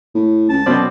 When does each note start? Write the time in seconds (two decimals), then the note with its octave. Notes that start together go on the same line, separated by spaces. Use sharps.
0.15 A2
0.49 C#2 A5
0.66 F#2 B2 C4 D5